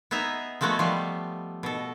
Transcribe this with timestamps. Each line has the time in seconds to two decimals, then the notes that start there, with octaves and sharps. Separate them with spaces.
0.11 B3 D#4 G#4 E5 A#5
0.61 F3 G#3 A3 B3 F#4 A4
0.79 F3 G3 A3 B3
1.63 B2 A4